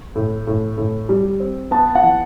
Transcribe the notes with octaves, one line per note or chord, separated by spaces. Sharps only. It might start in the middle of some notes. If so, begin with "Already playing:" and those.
A2
A2
A2
G3
C4
B3 A5
F#5
E3